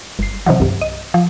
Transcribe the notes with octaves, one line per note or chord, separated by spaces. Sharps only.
G1 C7
C3 D#3 E3 F#3
C2 G2
D#5
F3